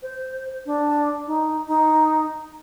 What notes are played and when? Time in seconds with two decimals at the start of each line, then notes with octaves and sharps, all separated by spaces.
0.02 C5
0.66 D4
1.27 D#4
1.68 D#4